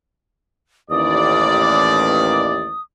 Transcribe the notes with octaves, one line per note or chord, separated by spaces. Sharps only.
A1 D#2 D5 D#6